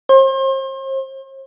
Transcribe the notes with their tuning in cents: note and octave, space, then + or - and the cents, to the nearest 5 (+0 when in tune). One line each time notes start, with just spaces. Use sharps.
C5 +40